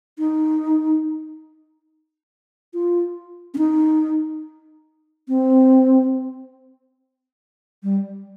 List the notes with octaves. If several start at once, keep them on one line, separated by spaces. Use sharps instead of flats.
D#4
F4
C#4
D#4
C4
G3